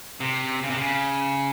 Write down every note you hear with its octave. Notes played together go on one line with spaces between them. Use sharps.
C3
C#3
C3
C#3